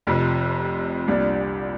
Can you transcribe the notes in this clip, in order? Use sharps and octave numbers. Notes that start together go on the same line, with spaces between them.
F1 F2 C3
C2 A#2 G3 D4